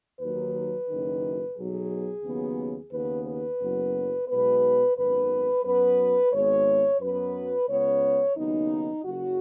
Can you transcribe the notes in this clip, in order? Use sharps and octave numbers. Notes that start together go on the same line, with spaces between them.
D#2 D#3 F#3 B4
F#1 F#2 D#3
B1 B2 F#3 G#4
D#2 C#3 F#3 B3
D#2 C#3 B3 B4
B4
F#1 F#2 F#3 B3
B1 B2 G#3 B3 B4
G#1 F#2 D#3 B3 B4
F#2 F#3 B3 B4
G#1 G#2 G#3 B3 C#5
F#2 F#3 B3 B4
C#2 C#3 B3 C#5
D#2 C#3 F#3 B3 D#4
F#1 F#2 C#3 F#4